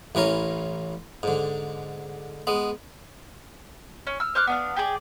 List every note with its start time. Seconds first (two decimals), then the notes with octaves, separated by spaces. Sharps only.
0.15 A1 E3 C#4 A#4
1.23 G#2 D3
2.47 G#3 B3
4.07 C#4
4.20 E6 F6
4.35 C5 D6 F6 F#6
4.47 B3 D4 F5
4.76 G4 G#4 D5